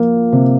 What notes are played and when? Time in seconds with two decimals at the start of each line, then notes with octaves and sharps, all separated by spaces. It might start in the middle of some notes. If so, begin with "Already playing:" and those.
Already playing: F3 A#3
0.32 C3